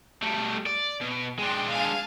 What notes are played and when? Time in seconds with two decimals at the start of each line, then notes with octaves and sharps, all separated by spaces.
0.23 G3 A3
0.66 D5
1.01 B2
1.39 G#3 D4 G5 C6
1.69 F5 G#5 A5